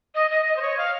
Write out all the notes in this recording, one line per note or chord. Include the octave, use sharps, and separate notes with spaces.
D#5
D#5
D#5
C5
C#5
F5